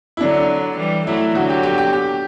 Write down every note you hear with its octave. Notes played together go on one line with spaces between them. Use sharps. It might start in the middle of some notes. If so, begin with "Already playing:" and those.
E4
D3 F#3 D4
E3 G3
F#3 A3 E4
D3 F#3 F#4
G4
G4
G4
G4